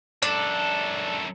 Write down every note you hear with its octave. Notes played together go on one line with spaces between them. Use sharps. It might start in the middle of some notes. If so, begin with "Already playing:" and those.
F#2 D4 A4